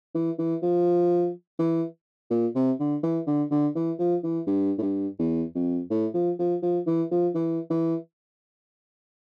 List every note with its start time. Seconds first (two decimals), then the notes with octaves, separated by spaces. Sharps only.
0.14 E3
0.39 E3
0.63 F3
1.59 E3
2.30 A#2
2.55 C3
2.80 D3
3.03 E3
3.27 D3
3.51 D3
3.75 E3
3.99 F3
4.24 E3
4.47 G2
4.78 A2
4.82 G2
5.19 E2
5.55 F2
5.90 A2
6.14 F3
6.39 F3
6.62 F3
6.87 E3
7.11 F3
7.35 E3
7.70 E3